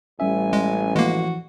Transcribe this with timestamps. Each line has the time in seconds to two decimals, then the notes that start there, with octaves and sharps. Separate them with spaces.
0.20 A1 G3 C#4 E5 G#5
0.53 G#3
0.96 E3 F3 G#3 A#3 F#4